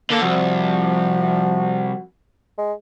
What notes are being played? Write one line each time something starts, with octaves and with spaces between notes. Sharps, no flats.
D3 A#3 A4
C2 F3 F#4
G#3